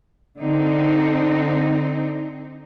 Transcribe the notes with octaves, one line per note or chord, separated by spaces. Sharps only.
D3 C4 D#4